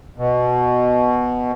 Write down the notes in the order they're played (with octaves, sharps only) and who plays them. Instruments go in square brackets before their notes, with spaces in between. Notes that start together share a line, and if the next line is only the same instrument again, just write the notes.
[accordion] B2